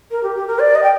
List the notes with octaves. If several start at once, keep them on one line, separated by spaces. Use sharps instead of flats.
A#4
G4
G4
A#4
D5
D#5
G5